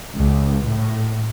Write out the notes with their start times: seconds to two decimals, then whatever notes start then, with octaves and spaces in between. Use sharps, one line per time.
0.15 C#2
0.67 A2